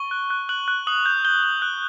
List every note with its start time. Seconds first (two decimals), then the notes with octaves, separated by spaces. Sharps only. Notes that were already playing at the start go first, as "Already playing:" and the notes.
Already playing: C#6 G7
0.11 F#6
0.30 F#6
0.49 F#6 F#7
0.68 F#6
0.87 D#6 F#7
1.06 G6
1.25 G6 G7
1.43 G6
1.62 F#6